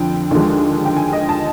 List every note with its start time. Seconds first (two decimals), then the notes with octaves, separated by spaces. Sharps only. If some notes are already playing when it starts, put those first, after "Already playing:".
Already playing: F2 D3 F3 G5
0.31 D#2 D3 F3 G#3
0.85 G5
0.96 G#5
1.13 D#5
1.29 A5